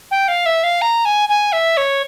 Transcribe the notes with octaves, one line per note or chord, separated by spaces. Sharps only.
G5
F5
E5
F5
A#5
G#5
G#5
E5
C#5